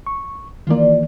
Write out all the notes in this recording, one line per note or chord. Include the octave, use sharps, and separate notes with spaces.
C#6
D#3 E3 A#3 F4 D5